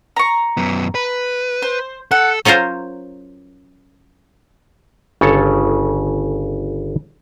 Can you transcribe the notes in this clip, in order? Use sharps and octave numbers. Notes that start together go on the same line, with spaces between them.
A#5 C#6
F#2 B3
B4
C5
A4 F#5
F#3 C#4 F4 A#4 C5
G1 C#3 A4 C#5